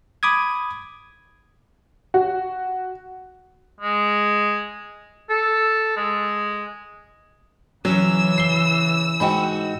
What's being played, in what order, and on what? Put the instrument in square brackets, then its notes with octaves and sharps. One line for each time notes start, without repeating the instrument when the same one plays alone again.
[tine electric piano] B5 D6 D#6 G#6
[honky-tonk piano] F#4
[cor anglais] G#3
A4
G#3
[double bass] C#3 E3 [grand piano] F#3 [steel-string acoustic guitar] C#4 [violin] E6
[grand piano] C7 G7
[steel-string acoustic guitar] G#2 D#4 F#4 [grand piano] G5 B5